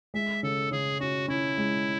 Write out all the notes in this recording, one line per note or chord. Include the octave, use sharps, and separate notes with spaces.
G#3 E5
C#3 A4
C#3 G#4
C#4 F#4
C#4 E4
G#3